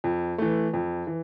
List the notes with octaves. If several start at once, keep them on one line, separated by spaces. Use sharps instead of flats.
F2
E3 A3
F2
E3